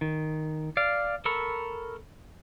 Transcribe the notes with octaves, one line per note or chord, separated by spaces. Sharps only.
D#3
D5 F5
A4 A#4 B5 C#6 E6